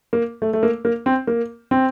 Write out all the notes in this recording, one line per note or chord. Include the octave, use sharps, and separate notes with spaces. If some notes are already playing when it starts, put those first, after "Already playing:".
A#3
A3
A3
A#3
A#3
C4
A#3
C4